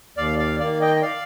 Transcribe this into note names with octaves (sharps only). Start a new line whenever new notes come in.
D#2 D5 F5
D5 F5
D#3 A#3 D5 F5
D#5 G5
G5
D5 F5